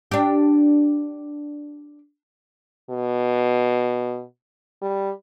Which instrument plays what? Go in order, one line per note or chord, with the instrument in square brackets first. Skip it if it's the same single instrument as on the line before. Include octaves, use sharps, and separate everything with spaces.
[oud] D4 G4
[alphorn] B2
G3